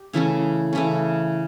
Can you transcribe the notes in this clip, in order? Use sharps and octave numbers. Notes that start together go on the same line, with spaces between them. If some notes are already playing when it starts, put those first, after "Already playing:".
Already playing: G4
C#3 E3 A3 C#4
C#3 E3 A3 C#4